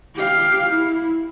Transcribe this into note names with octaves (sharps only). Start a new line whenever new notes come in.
G4 F5
E4